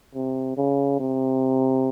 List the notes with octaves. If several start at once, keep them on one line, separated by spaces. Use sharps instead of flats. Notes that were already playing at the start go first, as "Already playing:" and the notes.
C3
C#3
C3